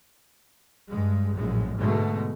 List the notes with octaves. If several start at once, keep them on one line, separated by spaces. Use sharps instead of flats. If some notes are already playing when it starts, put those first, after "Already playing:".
G2 G#3
A#1 F#2 A2 G#3
G#2 B2 D3 G#3 A3